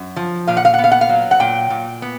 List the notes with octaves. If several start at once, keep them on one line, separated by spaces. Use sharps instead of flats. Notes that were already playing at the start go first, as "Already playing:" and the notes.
Already playing: F#2
F3
A#2 F5
F#5
F5
F#5
B3
F5
F#5
F5
F#3
F#5
A#2 G5
A#2
B3